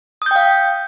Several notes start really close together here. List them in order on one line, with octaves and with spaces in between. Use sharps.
D#6 G6 G5 F5